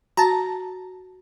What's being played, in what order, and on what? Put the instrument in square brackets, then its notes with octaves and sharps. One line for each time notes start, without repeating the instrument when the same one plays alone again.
[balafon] F#4 [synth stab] A5 A#5